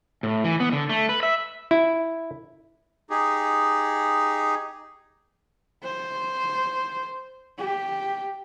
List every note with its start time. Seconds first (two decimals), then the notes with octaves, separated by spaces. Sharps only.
0.23 A2
0.44 E3
0.60 B3
0.72 D3
0.89 A3
1.09 B4
1.23 E5
1.71 E4
3.10 D#4 G4 G#4
5.83 C5
7.58 G4